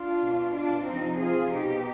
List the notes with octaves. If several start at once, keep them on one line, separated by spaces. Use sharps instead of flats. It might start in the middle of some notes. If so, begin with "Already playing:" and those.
Already playing: D4 F4
B2
D4 F4
C3 F3 C4 D#4
F4 G#4
B2 D#4 G4